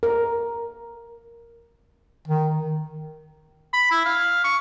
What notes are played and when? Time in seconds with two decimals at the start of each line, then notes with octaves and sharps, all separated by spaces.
0.03 A#4
2.28 D#3
3.73 B5
3.91 E4
4.06 F5
4.44 C#6